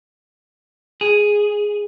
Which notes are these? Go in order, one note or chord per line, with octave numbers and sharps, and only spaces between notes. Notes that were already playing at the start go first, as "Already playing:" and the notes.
G#4